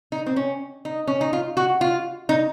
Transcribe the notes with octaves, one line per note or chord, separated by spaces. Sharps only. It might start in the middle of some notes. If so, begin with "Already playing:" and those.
D#4
C4
C#4
D#4
C#4
D#4
F4
F#4
F4
D#4